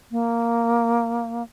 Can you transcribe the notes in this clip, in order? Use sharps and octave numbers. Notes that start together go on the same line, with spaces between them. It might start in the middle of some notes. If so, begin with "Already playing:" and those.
A#3